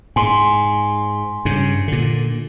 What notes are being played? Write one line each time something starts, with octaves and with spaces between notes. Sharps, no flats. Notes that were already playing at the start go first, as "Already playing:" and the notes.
G#2 G#5 C6
G2 C#3
A#2 D3